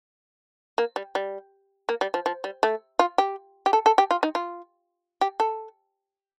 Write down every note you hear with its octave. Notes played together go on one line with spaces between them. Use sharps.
A#3
G3
G3
A#3
G3
F3
F3
G3
A3
F4
G4
G4
A4
A4
G4
F4
D#4
F4
G4
A4